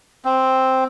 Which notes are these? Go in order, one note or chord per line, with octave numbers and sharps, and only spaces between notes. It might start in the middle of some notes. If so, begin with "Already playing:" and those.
C4